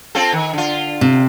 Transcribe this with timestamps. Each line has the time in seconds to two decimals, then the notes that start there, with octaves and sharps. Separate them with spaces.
0.15 C4 F4 A4
0.33 D#3
0.53 D3 F4
1.01 C3